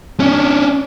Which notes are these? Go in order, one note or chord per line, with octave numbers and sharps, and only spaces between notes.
C#4 D4